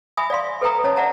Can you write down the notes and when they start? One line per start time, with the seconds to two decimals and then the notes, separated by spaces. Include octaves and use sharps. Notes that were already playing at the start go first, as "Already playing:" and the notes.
0.17 E5 G#5 B5 D#6
0.30 D5 E5 F5 C6
0.61 A4 B4 E5 G5 A#5 D#6
0.84 C#4 C#5 D#5 A5
0.96 D5 E5 F#5 A5 A#5